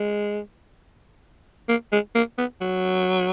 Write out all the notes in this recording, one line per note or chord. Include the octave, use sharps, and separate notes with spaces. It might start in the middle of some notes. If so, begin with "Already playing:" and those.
Already playing: G#3
A#3
G#3
A#3
B3
F#3